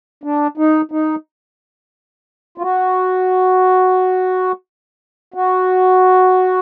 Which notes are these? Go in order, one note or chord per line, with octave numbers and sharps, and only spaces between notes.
D4
D#4
D#4
F4
F#4
F#4